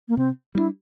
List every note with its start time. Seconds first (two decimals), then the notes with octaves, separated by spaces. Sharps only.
0.08 A#3
0.17 C3 C4
0.55 G3 A#3 D4 E4